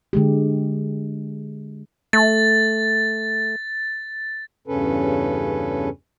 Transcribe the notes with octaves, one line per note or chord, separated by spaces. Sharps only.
D3 G#3 G4
A3 A6
E2 G2 C#3 C#4 A4 B4